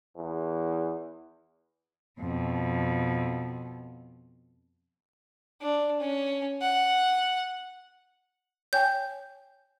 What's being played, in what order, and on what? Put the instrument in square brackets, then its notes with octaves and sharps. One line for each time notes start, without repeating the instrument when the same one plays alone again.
[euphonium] E2
[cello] F2 B2
[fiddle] D4
C#4
F#5
[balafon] C#5 G5 G#5 [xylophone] G6